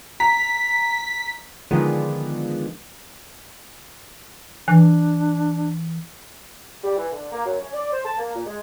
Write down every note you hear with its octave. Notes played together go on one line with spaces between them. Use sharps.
A#5 B6
D3 D#3 F3 G#3 B3
E3 D4
G3
E3
D3
A#3
F#2
C#4
D5
C5
A5
A#3
A#2
G#3